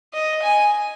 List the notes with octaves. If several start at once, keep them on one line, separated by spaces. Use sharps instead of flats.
D#5
G#5